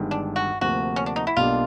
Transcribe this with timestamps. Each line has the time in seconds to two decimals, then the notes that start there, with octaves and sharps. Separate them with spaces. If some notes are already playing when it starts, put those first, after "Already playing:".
Already playing: G1 G2 D#3 G#3
0.11 D4
0.36 F#4
0.61 D2 C3 F3 A#3 F#4
0.96 C#4
1.06 D4
1.16 D#4
1.27 E4
1.37 B1 B2 G3 A#3 D4 F4